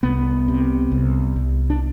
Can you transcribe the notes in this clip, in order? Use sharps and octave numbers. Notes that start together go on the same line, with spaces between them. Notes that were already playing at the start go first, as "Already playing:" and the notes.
C2 B3
C3
C2
C2
D4